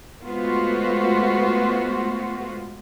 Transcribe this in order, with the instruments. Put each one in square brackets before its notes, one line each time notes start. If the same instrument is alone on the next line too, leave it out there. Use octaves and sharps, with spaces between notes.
[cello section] G#3 A3 B3 F4 F#4 C5